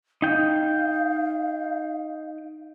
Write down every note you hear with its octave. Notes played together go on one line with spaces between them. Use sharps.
D#4 F5 G5